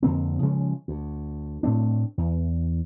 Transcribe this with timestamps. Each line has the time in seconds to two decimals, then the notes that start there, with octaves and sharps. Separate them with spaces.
0.03 F2 D3 A#3 C4
0.42 C#3 F3 G#3 C#4
0.88 D2
1.63 A2 A3 C4 D4
2.18 E2